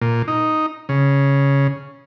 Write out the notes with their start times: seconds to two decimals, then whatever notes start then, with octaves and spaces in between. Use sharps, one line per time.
0.02 A#2
0.28 D#4
0.89 C#3